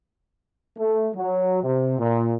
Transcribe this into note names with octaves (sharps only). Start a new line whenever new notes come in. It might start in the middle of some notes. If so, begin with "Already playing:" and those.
A3
F#3
C3
A#2